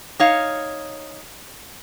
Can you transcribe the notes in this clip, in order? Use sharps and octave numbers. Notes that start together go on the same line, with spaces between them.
D#4 C#5 F5